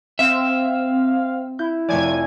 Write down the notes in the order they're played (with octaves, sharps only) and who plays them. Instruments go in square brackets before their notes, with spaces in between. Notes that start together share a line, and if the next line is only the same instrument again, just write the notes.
[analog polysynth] C4 [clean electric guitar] E5 [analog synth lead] F5
[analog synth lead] E4 [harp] G6
[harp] F1 A3 D5 [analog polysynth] F3 G#5 G#6